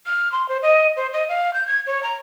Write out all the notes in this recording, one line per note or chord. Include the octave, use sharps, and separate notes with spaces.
F6
C6
C5
D#5
C5
D#5
F5
G6
G#6
C#5
A#5